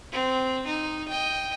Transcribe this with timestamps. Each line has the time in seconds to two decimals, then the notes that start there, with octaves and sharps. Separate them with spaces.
0.12 C4
0.66 D#4
1.08 D#5 G5